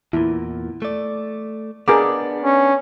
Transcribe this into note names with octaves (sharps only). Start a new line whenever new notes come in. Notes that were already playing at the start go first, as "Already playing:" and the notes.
E2 A#2 E4
A3 D5
B3 D4 G#4 A#4 D6
C#4